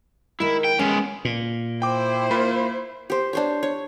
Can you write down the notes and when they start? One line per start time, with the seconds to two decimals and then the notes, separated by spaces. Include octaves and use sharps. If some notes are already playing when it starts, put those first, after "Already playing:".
0.40 D#3 G#3 E4
0.64 G5
0.79 G#3 B3 C#4
1.25 A#2
1.82 E4 C5 G5 D6
2.31 A#3 F4 B5
3.10 G4 C5
3.33 D4 C5 C#5
3.63 C#5